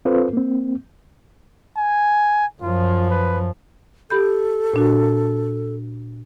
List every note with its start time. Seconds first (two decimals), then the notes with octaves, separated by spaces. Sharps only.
0.05 C4 F4 A4 B4 C5
0.33 A#3 C4
1.77 G#5
2.62 F#2 F3 F4
3.11 B4
4.10 G4 A4 B5 G6
4.74 A#2 D4 F#4